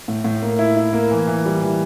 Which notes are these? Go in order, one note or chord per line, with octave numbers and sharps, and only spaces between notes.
A2
A2
A#3
E4
E4
A#3
E3
E3
G3
E3